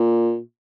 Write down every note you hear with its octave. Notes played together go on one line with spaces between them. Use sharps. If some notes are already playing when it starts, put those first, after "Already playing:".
Already playing: A#2